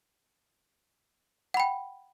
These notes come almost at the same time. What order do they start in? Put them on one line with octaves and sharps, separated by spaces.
F#5 B5 G5